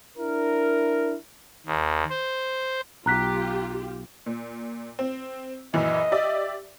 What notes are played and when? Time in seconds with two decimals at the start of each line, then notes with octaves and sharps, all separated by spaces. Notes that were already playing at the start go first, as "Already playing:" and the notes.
0.17 D4 E4 A#4
1.66 D#2
2.10 C5
3.06 B1 F4 G4 A#5 F#6 B6
4.26 A#2
4.99 C4
5.74 A#1 F#2 E3 D#5
6.12 G4 D5 E5